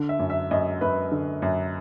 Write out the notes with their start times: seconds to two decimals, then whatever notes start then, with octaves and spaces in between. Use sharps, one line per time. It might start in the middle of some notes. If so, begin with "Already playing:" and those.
Already playing: D3
0.09 E5
0.19 F#2
0.30 E5
0.51 F#2 D#5
0.81 F#2 B4
1.11 D3
1.42 F#2